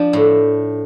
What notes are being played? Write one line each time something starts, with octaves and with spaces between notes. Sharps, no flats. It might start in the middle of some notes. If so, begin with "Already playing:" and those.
Already playing: F3 D4
A2